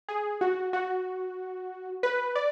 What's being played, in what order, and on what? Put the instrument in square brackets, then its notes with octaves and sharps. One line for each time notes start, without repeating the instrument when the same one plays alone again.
[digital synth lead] G#4
F#4
F#4
B4
D5